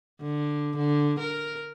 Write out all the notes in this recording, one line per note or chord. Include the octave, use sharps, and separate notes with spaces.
D3
D3
A#4